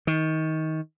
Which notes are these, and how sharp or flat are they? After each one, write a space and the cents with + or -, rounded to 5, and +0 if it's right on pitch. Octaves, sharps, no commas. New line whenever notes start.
D#3 +25